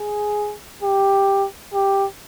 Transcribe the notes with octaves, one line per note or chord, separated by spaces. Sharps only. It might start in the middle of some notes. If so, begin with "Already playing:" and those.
Already playing: G#4
G4
G4